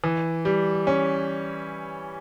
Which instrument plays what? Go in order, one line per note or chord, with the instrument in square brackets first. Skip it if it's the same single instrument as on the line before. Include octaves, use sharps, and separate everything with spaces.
[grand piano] E3
G3
C#4